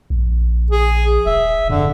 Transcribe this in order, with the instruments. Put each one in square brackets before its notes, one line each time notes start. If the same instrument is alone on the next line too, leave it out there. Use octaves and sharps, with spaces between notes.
[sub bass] A#1
[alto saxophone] G#4
[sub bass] D#1 [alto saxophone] E5
[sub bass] F2 [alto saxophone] D3